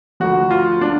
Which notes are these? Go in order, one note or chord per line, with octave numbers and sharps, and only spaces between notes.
D2 D3 F3 F#4
F4
D4